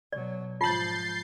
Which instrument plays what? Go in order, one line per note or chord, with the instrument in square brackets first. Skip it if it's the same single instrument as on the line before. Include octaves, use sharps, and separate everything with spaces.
[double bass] B2 F#3 [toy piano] D5
[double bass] G#2 F3 [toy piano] F4 [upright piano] A5 F#7 [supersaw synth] G6 A6 C7